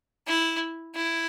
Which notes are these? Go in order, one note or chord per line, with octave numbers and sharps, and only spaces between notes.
E4
E4